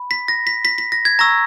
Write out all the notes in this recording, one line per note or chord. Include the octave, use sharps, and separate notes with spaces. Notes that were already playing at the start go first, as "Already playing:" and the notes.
Already playing: B5
B6
A#6
B6
B6
B6
A#6
G#6
A#5 C#6 E6 A#6